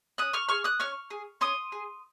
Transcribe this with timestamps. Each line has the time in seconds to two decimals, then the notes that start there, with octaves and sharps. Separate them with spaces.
0.18 C#4 D#6 F#6
0.33 C#6 F6
0.49 G#4 C#6 F6
0.64 D#6 F#6
0.80 C#4 C#6 F6
1.10 G#4
1.41 C#4 C6 D#6
1.72 G#4